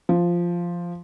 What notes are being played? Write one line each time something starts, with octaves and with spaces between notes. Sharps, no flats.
F3